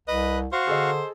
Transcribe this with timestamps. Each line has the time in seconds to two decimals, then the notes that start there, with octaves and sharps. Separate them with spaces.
0.08 C2 B4 D#5 F#6
0.52 F#4 C5 F5 C#6
0.67 D3 G#4 A4 D#5